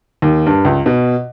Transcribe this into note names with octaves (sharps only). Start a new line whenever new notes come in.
D#2
G2
C#2
B2